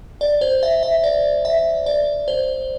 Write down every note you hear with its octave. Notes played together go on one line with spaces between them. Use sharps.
D5
C5
E5
E5
D5
E5
D5
C5